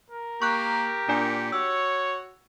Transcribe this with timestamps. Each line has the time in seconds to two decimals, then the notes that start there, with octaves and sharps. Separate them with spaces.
0.10 A#4
0.42 A#3 G4 C#6 F#6
1.09 A#2 D4 D5 G#5
1.52 F#4 C#5 E6